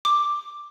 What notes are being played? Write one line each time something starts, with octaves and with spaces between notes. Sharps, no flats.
D6